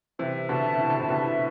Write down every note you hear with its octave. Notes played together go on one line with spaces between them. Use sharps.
C3 E3 E5
B2 D3 A5
C3 E4
D3
A2 C3
B2 D3 E5